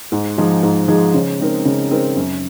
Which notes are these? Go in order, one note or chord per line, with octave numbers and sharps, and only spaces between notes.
G#2
F3 G#3 D#4 G#4
G#2
F3 G#3 D#4 G#4
C#3
G#3 C4 D#4 A#4
C#3
G#3 C4 D#4 A#4
F#2